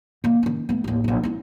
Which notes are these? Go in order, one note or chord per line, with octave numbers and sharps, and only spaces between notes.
D#3 A#3
D#3 C#4
A3 B3
A1 D#2
E1 A#1
C4 E4